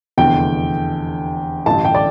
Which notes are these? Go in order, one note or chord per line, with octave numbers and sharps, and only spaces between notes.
F1 E2 D3 G5
A1 G2 D3 A5
G5
D5